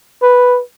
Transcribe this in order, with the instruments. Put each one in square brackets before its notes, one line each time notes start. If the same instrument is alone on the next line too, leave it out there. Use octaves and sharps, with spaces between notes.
[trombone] B4